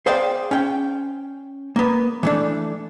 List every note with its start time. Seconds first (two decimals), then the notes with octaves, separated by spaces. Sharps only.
0.06 G#4 C5 D5 F5 G5
0.51 C#4 G5
1.76 A#3 B3
2.23 E3 A3 D4